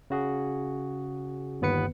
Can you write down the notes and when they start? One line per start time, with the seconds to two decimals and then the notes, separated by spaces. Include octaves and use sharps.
0.10 C#3 F#4 G#4
1.61 G1 D#2 B3 B4 C#7